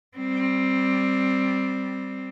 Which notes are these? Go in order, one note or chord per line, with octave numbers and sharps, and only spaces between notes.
G3 C4